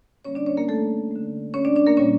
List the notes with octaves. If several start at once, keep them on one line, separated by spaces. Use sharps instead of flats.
D3 G3 A#3 C#4 C#5
D4 D5
C#4 C#5
A#3 A#4
A3 A4
D3 A3
C#4 C#5
D4 D5
D4 D5
A#3 A#4
A#2 G3 A#3 C#4 C#5